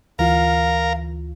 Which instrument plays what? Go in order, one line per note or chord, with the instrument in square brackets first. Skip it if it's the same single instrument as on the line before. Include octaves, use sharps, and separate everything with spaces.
[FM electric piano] D2 E3 F4 [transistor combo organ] A#4 [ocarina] F5